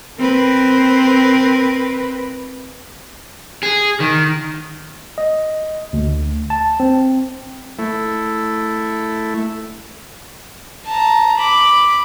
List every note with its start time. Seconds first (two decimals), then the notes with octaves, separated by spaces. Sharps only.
0.19 C4 A#4 B4
3.63 G#4
4.00 D#3
5.18 D#5
5.93 D2
6.50 A5
6.80 C4
7.79 A3 E4
10.86 A5 A#5
11.37 B5 D6